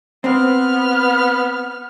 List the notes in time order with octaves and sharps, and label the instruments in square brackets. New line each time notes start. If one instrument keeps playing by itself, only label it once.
[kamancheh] B3 F6 [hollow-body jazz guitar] C4